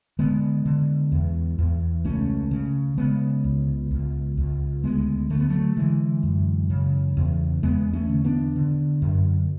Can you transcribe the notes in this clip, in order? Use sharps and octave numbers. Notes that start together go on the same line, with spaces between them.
D3 G#3 B3
D3
E2
E2
C#2 A3 C#4
C#3
C#3 G#3 B3
C#2
C#2
C#2
D2 G#3 B3
D3 A3
B3
F#3 A3
D3 E3 G#3
F#2
C#3
E2
E2 G#3 B3
A3 C#4
D3
B3 D4
D3
F#2